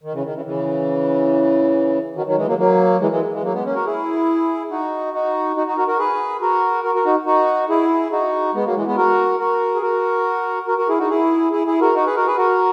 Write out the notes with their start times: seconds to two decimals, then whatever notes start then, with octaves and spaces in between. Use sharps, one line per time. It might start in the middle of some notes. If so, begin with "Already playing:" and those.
0.03 D#3
0.13 C#3 E3
0.24 D#3
0.35 C#3 E3
0.45 C#3 E3
2.16 D#3 F#3
2.26 D#3 F#3
2.37 E3 G#3
2.47 F#3 A#3
2.58 F#3 A#3
3.01 E3 G#3
3.11 E3 G#3
3.33 E3 G#3
3.43 F#3 A#3
3.54 G#3 B3
3.65 A#3 C#4
3.75 F#4 A#4
3.86 E4 G#4
4.71 D#4 F#4
5.14 D#4 F#4
5.56 D#4 F#4
5.67 D#4 F#4
5.77 F#4 A#4
5.88 F#4 A#4
5.99 G#4 B4
6.41 F#4 A#4
6.84 F#4 A#4
6.95 F#4 A#4
7.05 D#4 F#4
7.26 D#4 F#4
7.69 E4 G#4
8.12 D#4 F#4
8.55 G#3 B3
8.65 F#3 A#3
8.75 E3 G#3
8.86 G#3 B3
8.97 F#4 A#4
9.39 F#4 A#4
9.75 G#4
9.82 F#4 A#4
10.67 F#4 A#4
10.78 F#4 A#4
10.89 E4 G#4
10.99 D#4 F#4
11.10 E4 G#4
11.52 E4 G#4
11.67 E4 G#4
11.81 F#4 A#4
11.95 D#4 F#4
12.06 G#4 B4
12.16 F#4 A#4
12.27 G#4 B4
12.37 F#4 A#4